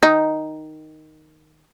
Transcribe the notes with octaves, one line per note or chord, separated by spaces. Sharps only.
D#3 D#4